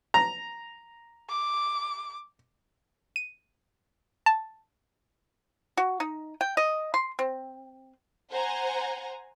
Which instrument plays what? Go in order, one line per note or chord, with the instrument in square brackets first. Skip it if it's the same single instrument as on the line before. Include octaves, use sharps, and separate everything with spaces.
[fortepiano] A#5
[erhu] D6
[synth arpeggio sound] D#7
A5
[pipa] F#4
D#4
G5
D#5
C6
C4
[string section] C5 F#5 G#5 A#5